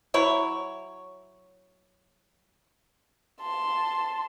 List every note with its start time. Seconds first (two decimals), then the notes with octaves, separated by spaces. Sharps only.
0.14 F#3 E4 C#5
3.41 A5 C6